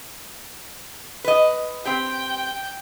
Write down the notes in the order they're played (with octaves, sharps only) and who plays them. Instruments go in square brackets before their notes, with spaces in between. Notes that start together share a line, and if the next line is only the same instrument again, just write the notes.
[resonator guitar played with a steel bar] B4 D#5
[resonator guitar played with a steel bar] C4 G4 [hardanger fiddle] G5